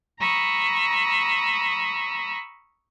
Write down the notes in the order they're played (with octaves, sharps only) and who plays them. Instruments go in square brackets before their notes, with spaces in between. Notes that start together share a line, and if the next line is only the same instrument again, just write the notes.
[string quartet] A#5 B5 C#6 D#6 E6